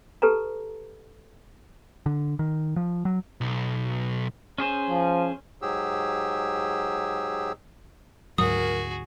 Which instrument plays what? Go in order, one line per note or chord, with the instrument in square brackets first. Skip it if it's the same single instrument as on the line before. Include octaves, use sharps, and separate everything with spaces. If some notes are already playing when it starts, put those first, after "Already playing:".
[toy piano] G4 A4 B4 A5 A#5
[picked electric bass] D3
D#3
F3
F#3
[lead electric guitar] B1
[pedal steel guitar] C#4 G#4 C5
[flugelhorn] F3
[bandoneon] G#2 F#3 G4 G#4 E6
[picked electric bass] D2 G#2 F#3 [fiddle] F#4 G#4 [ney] A#4 [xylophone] D#6